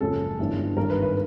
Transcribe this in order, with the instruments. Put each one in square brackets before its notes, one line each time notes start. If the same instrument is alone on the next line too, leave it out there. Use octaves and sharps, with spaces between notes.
[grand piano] F#1 F#2 C#3 F3 G#3 A4
G1 G2 E3 G3
G#1 G2 D#3 A#4
B4
B4